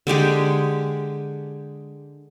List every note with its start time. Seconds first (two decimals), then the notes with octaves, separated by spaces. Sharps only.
0.07 D3 G#3 G4 G#4